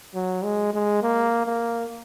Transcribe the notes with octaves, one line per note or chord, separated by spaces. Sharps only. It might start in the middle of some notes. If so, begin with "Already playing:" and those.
F#3
G#3
G#3
A#3
A#3